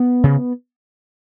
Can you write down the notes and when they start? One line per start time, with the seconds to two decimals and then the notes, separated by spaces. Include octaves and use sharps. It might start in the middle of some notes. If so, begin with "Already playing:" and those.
Already playing: B3
0.24 C#3